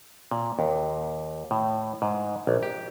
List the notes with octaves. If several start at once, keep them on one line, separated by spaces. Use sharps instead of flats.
A#2
D#2
A2
G#2
A#1
G4